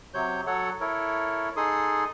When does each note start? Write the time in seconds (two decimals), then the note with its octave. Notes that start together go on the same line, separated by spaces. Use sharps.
0.14 C3 F#3 C#5 G6
0.47 F#3 A4 C#5 F#5
0.81 E4 A4 A#4 C#5
1.57 D#4 G#4 A4 C6 D#6